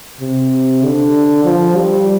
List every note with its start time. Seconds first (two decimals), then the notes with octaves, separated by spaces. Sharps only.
0.21 C3
0.84 D3
1.45 F3
1.76 G3